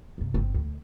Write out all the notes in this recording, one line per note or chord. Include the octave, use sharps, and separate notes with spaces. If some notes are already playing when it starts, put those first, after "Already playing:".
G2 C3
G1 C4
D2